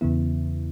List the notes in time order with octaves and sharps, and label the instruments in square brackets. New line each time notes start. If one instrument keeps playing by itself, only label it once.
[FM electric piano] E2 C#3 E3 B3 E4